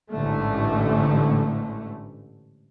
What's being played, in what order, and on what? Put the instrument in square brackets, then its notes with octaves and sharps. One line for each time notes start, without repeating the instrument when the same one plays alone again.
[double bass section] A1 G#2 D3 A3